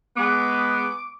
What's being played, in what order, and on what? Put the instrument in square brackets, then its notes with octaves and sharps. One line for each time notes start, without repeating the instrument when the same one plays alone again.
[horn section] G#3 B3 [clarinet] D6